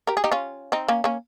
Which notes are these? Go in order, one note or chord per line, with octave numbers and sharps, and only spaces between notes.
G4 A#4
G#4
D#4 G4
C#4 F4
C4 D#4
A#3 C#4
A#3 C#4